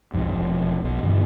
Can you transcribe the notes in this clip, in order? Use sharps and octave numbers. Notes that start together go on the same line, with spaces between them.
B1 F2 G#2
E1 F3
B1 B2
G2 D3 E3 B3